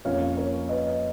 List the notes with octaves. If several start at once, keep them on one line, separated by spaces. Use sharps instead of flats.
F2 F3 A#3 C#4 C#5 F5
A#4 C#5
B4 D#5